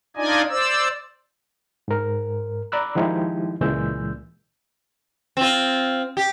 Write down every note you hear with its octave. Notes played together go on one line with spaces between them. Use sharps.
D4 D#4 F4 D5 D#5 G#5
C5 D5 E6
G#2 A#4
D5 A#5 B5 D6 E6 F#6
D#3 F3 G#3 D#4 E4 G4
C#2 A#2 E3 G#3 E6 G6
C4 F4
G4